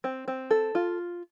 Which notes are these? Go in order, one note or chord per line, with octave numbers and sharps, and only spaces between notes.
C4
C4
A4
F4